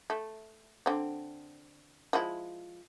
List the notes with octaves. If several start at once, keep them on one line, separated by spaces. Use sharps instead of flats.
A3
D3 C4
F3 G#3 E4